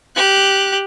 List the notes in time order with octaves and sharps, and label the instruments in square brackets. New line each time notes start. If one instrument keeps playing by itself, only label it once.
[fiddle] G4 F#6